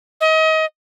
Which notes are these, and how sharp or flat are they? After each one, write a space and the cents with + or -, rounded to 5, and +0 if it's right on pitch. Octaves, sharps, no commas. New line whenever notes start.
D#5 +30